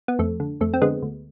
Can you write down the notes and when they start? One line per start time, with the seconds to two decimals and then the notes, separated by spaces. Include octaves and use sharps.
0.08 B3
0.19 F2 A3
0.40 D3
0.61 F2 A3
0.74 C4
0.82 D3 G#3 B3
1.03 D2